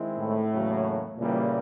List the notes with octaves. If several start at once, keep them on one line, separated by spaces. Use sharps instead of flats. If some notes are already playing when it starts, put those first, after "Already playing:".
Already playing: D#3 G#3 C4 E4
A2
E2 C#3 F#3 A#3
A#2 C#3 E3 G3 A#3